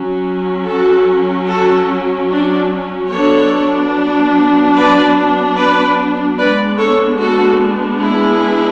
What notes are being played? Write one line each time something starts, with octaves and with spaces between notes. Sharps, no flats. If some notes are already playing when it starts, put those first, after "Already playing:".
Already playing: F#3 C#4
F#4 A4
F#4 A4
D4
F#3 B3 D4 A4 C#5
B4 D5
B4 D5
G#3 B3 D4 B4 D5
A4 C#5
F#4 A4
E4 G#4